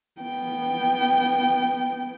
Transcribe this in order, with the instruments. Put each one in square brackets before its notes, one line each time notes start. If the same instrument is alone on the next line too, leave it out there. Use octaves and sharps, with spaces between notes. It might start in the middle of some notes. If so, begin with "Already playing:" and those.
[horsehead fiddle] B3 G5